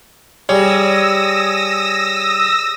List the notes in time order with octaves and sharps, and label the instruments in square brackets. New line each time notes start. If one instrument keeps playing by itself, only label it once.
[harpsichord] G3 [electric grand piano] G#4 C#5 [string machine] D#6 E6 A#6